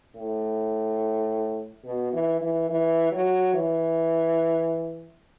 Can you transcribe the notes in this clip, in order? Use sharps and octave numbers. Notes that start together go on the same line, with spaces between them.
A2
B2
E3
E3
E3
F#3
E3